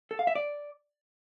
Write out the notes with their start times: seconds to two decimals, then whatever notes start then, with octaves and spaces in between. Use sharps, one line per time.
0.11 A4
0.19 F5
0.27 E5
0.35 D5